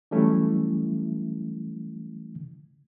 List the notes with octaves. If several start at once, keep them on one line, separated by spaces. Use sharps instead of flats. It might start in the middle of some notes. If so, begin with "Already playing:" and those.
E3 F#3 G3 A3 C#4 E4